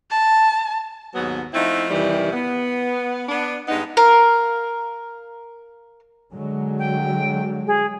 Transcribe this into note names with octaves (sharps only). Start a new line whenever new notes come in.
A5
D#2 G#2 F#3 B3
F3 A3 C4 D#4 E4
F2 C3 D#3 E3 G3
B3
B3 D4
G2 G#3 B3 D#4
A#4 F5
D3 F#3 G#3
G5
G#4